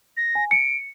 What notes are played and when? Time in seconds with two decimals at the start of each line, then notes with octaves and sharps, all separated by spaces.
0.17 A#6
0.35 G#5
0.51 C#7 D7